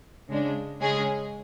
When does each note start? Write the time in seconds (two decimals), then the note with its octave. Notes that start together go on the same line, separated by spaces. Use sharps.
0.29 C#3 G#3 D4
0.81 C#3 G#3 C#4 G#4